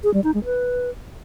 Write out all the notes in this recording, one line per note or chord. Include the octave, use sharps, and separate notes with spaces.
G#4
G3
D#4
G#3
B4